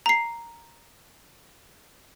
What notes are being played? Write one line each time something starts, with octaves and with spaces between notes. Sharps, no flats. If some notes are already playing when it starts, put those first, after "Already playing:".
A#5 C7